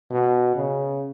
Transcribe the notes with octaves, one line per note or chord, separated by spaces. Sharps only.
B2
C#3